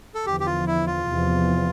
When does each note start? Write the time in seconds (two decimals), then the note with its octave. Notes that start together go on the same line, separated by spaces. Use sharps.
0.15 A4
0.25 E2 D3 F3 G4
0.40 G4
0.46 F4
0.67 E4
0.87 F4
1.08 E2 C3 F3